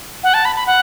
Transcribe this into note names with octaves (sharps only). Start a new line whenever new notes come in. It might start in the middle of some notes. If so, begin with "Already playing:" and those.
F#5
A5
B5
B5
F#5